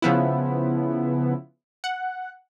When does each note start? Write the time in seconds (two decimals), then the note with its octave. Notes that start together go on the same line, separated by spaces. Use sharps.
0.02 C#3 F3 B3 E4
1.84 F#5